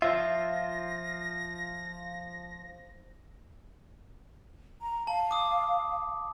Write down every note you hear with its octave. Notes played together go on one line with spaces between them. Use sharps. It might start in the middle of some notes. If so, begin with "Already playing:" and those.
F3 F4 E5 A#6
A#5
F5 A5
D6 D#6